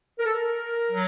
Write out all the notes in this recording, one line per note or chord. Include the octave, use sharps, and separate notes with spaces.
A#4
A4
A#4
F#3